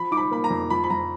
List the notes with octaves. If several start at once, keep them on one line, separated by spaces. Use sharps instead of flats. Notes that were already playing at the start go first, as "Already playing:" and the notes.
Already playing: F3 B5
D#4 D6
B5
A#3 B5
A#5
F2
F3 B5
B5
F2 A#5